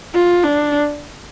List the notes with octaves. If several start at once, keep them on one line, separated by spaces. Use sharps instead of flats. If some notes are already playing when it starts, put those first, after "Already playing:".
F4
D4